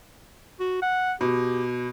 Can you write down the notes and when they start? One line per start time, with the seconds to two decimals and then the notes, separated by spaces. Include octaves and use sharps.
0.60 F#4
0.82 F#5
1.21 B2 G4